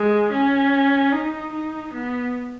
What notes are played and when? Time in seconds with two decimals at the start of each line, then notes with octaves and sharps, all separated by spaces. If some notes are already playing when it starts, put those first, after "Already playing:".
Already playing: G#3
0.32 C#4
1.12 D#4
1.53 D#4
1.93 B3